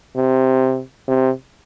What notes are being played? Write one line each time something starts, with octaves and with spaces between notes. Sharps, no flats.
C3
C3